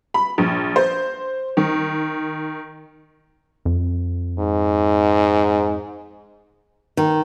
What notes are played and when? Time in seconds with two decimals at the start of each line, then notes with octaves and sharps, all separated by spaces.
0.14 B5
0.38 A#1
0.76 C5
1.57 D#3
3.65 F2
4.39 G#2
6.97 D#3